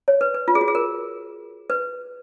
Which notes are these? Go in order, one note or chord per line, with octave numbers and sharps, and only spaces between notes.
C#5
B4
B4
F4
G#4
F#4
G#4
A#4
B4